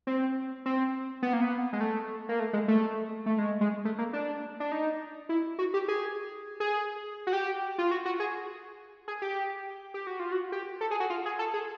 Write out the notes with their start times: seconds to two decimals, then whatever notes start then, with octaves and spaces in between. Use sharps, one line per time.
0.07 C4
0.66 C4
1.23 B3
1.33 A#3
1.41 B3
1.73 G#3
1.81 A3
2.29 A#3
2.40 A3
2.53 G#3
2.68 A3
3.26 A3
3.38 G#3
3.61 G#3
3.85 A3
3.98 A#3
4.13 D4
4.60 D4
4.72 D#4
5.29 E4
5.59 F#4
5.74 G4
5.88 G#4
6.60 G#4
7.27 F#4
7.33 G4
7.78 F4
7.91 F#4
8.05 F#4
8.20 G#4
9.08 G#4
9.22 G4
9.94 G4
10.07 F#4
10.20 F4
10.32 F#4
10.52 G4
10.81 A4
10.91 G#4
11.00 F#4
11.10 F4
11.26 G#4
11.39 A4
11.54 G#4